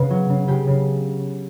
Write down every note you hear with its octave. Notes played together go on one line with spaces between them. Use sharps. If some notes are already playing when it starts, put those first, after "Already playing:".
Already playing: C#3 B3
F#3
C#3
C#3 G4
C#3